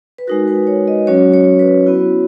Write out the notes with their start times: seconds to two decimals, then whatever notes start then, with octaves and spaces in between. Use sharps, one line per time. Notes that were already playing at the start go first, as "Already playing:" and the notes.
0.18 B4
0.27 G#3 D#4 F#4 A#4
0.48 B4
0.67 C#5
0.88 D#5
1.07 F#3 C#4 F#4 C#5
1.34 C#5
1.59 B4
1.86 B3 E4 F#4